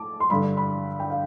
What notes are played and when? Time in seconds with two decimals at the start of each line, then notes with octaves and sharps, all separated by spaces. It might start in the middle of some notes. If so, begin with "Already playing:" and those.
Already playing: A2 A5 D6
0.20 C6
0.30 G2 D3 B5
0.57 B5
1.00 G5
1.10 F5